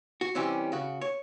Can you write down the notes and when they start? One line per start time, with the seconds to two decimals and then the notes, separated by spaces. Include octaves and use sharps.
0.21 F#4
0.35 C3 E3 G3 C#4
0.72 C#3 F#4
1.01 C#5